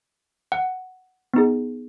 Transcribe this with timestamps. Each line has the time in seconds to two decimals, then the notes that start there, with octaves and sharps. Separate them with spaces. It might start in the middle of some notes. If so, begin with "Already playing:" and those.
0.52 F#5
1.34 B3 D#4 G#4